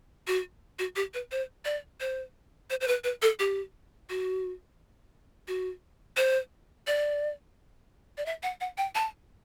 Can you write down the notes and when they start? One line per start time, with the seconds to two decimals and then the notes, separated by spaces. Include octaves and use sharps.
0.27 F#4
0.79 F#4
0.96 G4
1.14 B4
1.31 C5
1.65 D5
2.00 C5
2.70 C5
2.81 C5
2.88 B4
3.04 B4
3.22 A4
3.39 G4
4.09 F#4
5.48 F#4
6.17 C5
6.87 D5
8.18 D5
8.26 E5
8.43 F#5
8.61 F#5
8.78 G5
8.95 A5